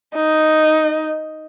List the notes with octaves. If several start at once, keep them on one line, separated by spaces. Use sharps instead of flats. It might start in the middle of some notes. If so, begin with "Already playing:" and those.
D#4